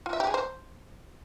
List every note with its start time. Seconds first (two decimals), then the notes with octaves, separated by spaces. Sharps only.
0.06 F4
0.13 E5
0.20 G4
0.27 G#4
0.34 C5